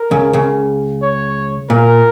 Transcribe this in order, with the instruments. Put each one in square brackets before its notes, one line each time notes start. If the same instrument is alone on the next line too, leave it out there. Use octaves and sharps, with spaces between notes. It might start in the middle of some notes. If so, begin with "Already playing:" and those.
Already playing: [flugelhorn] A#4
[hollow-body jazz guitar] C#2 C#3
C#2 C#3
[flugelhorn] C#5
[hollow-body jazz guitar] A#2 [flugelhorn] A#4